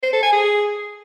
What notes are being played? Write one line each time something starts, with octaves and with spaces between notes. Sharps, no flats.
C5
A4
G#5
G#4